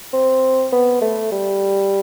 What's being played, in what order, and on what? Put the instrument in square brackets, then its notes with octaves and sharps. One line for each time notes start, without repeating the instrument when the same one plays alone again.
[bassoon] C4
B3
A3
G3